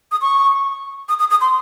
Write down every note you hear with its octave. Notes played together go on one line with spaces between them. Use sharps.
D#6
C#6
D#6
D#6
D#6
C6